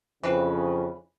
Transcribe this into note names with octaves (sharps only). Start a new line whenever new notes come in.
F2 C#3 E3 C4 B4